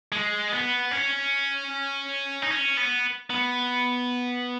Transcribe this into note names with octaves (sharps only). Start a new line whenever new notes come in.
G#3
B3
C#4
D#4
C#4
B3
B3